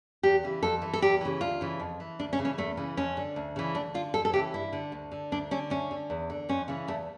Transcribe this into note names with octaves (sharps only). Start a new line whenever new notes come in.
E2 G4
C#3 E3
F2 A4
E3
A4
E2 G4
C#3 E3
D2 F4
C#3 E3
F2
E3
D2 D4
C#4
C#3 E3
C#4
E2 A3
C#3 E3
F2 C#4
D3
D2
C#3 E3
D2 D4
D3 F4
F2 A4
A4
C#3 E3 G4
G2 E4
D3
D2
D3
D2 D4
D3 C#4
D2 C#4
D3
E2
D3
F2 C#4
C#3 E3
E2 A3